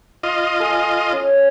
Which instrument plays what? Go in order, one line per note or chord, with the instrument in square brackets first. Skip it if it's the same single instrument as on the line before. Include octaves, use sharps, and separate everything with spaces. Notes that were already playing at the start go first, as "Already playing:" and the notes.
[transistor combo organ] F4 D#5
[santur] A4 G#5
C#4